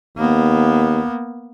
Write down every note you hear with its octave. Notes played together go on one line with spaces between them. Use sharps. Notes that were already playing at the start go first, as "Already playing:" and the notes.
D#2 A#3 B3